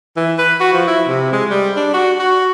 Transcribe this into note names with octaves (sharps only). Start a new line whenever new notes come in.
E3
B4
F#4
F3
E4
C3
G#3
G3
D4
F#4
F#4